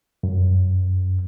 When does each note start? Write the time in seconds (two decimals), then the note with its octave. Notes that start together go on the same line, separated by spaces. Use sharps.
0.23 F#2